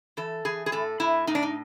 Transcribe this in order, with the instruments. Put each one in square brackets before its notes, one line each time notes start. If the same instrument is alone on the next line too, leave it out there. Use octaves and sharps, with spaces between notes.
[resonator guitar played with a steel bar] E3 A4
E3 G#4
G#4
A2 A4
A2 E4
A2 D#4
D4
D#4